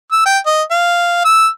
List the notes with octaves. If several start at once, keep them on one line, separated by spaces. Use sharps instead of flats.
E6
G5
D#5
F5
E6